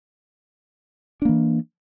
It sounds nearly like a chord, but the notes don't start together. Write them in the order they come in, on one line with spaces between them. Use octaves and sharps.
D4 A#3 E3